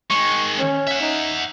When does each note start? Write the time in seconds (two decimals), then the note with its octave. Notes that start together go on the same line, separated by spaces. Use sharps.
0.10 D#3 G#3 C#6
0.59 C#4
0.87 E5 F#5
1.01 D#4